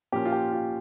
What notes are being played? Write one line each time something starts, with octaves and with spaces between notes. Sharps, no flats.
A#2 F3 A#3 C#4 G4
F4
G4
F4